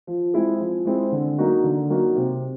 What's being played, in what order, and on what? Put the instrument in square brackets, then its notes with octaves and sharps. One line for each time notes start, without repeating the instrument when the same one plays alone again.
[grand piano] F3
G#3 C4 E4 G#4
F3
G#3 C4 E4 G#4
D3
F#3 A#3 D#4 F#4
D3
F#3 A#3 D#4 F#4
C3